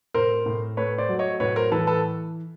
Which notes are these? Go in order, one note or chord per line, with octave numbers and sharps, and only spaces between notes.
A2 A#4 C5
A2
A3 B4 C#5
C5 D5
F#3
C#5 D#5
A2 B4 C#5
A#4 C5
E3 A4 B4
A4 B4